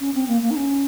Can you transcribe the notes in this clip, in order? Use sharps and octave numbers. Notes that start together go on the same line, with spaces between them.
C#4
C4
A#3
A#3
D#4
C#4